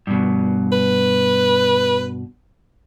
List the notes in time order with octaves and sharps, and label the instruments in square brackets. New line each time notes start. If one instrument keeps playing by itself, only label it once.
[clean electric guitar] G2 B2
[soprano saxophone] B4